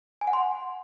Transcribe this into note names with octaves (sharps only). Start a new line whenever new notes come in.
G#5
F#5
C6